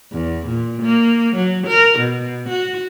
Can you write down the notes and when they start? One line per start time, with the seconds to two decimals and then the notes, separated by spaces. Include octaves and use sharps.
0.12 E2
0.47 A#2
0.83 A#3
1.36 F#3
1.67 A#4
1.99 B2
2.50 F#4